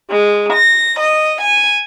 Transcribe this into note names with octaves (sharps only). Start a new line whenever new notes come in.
G#3
A#6
D#5
G#5